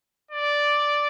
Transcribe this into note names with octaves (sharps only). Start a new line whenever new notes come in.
D5